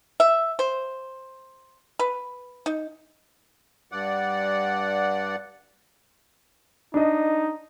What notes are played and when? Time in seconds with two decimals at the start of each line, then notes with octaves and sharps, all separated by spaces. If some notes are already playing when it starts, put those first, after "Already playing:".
0.20 E5
0.59 C5
1.99 B4
2.66 D#4
3.92 G2 D5 F#5
6.94 D4 D#4 D#5